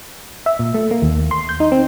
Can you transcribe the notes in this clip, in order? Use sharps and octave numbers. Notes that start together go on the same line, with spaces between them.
E5
A#2
A3
A#3
D#2
C6
G6
D#4
C4